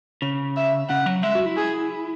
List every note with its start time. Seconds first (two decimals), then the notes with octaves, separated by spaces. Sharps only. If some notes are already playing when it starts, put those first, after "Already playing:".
0.22 C#3
0.57 E5
0.89 C#3 F#5
1.06 F#3
1.23 G#3 E5
1.35 F#4
1.46 E4
1.57 G#4